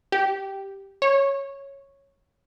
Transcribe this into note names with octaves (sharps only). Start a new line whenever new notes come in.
G4
C#5